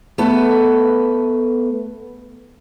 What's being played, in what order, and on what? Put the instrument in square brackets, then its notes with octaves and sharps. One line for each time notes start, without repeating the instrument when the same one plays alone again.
[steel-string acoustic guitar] A3 B3 A4 B4